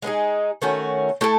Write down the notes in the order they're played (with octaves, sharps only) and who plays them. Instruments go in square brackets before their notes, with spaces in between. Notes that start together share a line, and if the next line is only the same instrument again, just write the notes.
[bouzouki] G#3 B3 D#4 G#4
D#3 A3 C#4 F#4
A3 E4 A4